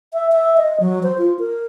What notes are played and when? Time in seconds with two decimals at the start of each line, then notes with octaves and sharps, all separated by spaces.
0.13 E5
0.32 E5
0.57 D#5
0.80 F#3
1.03 C5
1.18 F4
1.39 A#4